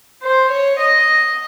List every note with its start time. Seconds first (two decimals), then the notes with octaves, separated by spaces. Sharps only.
0.22 C5
0.50 C#5
0.79 D#5